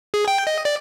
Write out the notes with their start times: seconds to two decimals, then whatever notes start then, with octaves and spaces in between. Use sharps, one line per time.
0.14 G#4
0.28 G5
0.47 D#5
0.65 D5